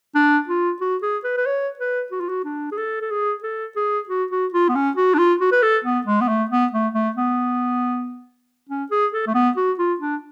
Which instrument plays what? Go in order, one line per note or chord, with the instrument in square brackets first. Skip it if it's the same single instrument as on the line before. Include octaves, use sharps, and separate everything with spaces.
[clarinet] D4
F4
F#4
G#4
B4
B4
C#5
B4
F#4
F4
F#4
D4
G#4
A4
A4
G#4
A4
G#4
F#4
F#4
F4
B3
C#4
F#4
D4
F4
F#4
B4
A4
B3
G#3
B3
A3
B3
A3
A3
B3
C#4
G#4
A4
A3
B3
F#4
F4
D4